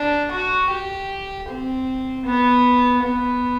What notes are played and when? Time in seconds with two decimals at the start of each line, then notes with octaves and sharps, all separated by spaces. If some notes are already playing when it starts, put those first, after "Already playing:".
Already playing: D4
0.31 F#4
0.70 G4
1.49 C4
2.25 B3
3.03 B3